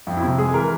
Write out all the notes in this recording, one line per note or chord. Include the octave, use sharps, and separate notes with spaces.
F2
E4
C3 F4
G#3 G#4
E3 A#4